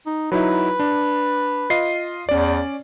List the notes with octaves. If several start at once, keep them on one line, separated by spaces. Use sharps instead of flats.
D#4
F#3 D#4 E4 B4
D4
F4 D#5 C7
E2 C#4 D5